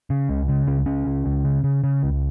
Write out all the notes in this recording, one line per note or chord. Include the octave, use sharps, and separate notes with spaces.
C#3
C#2
C#3
C#2 C#4
C#2 C#4
C#2
C#2
C#3
C#3
C#3
C#2